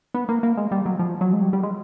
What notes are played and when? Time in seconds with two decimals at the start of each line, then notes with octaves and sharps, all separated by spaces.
0.14 B3
0.29 A#3
0.43 A#3
0.57 G#3
0.72 G3
0.86 F#3
0.99 F3
1.21 F#3
1.33 G#3
1.42 G3
1.53 G3
1.63 G#3